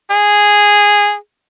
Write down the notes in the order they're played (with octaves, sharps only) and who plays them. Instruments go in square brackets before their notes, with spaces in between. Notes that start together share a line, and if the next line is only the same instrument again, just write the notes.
[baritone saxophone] G#4